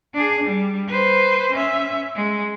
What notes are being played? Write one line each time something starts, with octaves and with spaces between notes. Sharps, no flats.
D4 G#4
G3
B4 C5
C#4 E5
G#3